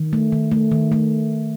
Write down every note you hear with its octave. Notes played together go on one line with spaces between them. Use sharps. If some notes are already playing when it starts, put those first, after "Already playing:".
Already playing: D#3
A3
D#3
A3
D#3
A3